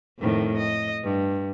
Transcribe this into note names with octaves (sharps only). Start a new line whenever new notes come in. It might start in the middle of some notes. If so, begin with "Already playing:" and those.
F2 A2 D#3
D#5
G2